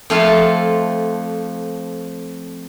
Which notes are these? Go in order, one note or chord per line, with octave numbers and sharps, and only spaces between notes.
F2 A3 C4 F4 A4 F5